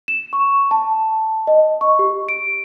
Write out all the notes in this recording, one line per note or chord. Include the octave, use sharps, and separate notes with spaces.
E7
C#6
A5
D#5
C#6
G4
D7